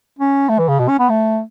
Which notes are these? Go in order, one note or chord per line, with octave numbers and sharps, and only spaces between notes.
C#4
A3
E3
C#3
B2
C#4
B3
A3